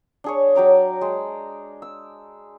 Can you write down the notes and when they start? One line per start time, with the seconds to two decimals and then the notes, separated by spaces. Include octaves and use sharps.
0.24 D4 G#4 C#5
0.55 F#3 G5 A#5 D6
1.01 G#3
1.82 E6